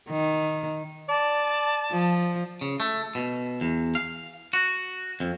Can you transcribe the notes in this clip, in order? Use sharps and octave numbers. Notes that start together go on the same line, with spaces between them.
D#3
D5 A5
F3
C#3
A3
B2
E2
F5
F#4
F2